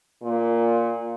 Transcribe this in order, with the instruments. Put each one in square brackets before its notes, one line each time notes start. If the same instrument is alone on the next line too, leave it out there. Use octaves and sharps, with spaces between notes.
[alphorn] A#2